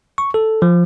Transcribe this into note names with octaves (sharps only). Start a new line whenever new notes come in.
C#6
A4
F3